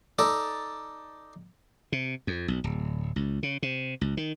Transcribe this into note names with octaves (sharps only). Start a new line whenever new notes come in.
D#4 A4 D5
C3
F2
B1
D1
C#2
C#3
C3
C#2
D#3